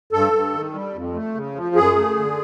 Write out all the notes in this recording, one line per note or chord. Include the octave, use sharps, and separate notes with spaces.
G2 A4
G2
D#3
G3
F2
A3
C#3
F3
F#2 G#4
A3
D3